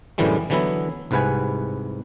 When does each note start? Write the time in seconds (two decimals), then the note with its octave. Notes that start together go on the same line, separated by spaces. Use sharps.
0.18 F#2 A2 D3 E3 G3 G#3
0.50 D3 E3 F#3 B3 E4
1.11 C2 G#2 C3 B4 F#5 G#5